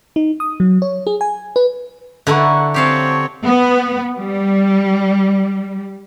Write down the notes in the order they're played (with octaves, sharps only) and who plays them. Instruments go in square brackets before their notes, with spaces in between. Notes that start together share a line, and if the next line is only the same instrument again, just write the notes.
[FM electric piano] D#4
D#6
F#3
C#5
G#4
G#5
B4
[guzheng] D3 E4 A4 [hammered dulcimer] F#5 A#5 C#6
[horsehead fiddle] C4 C#5 [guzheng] G4 F5 A5
[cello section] B3
G3